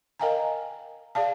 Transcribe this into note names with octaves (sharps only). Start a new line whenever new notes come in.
A#4 D#5 F5 G5 G#5 A#5
G#4 D5 F5 A5